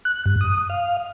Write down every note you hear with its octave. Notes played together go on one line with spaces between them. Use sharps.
F#6
G2
D#6
F5